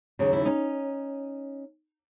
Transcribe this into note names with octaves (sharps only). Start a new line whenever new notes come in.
D#2 C#3 F#3 D#4
E4
C#4 D#4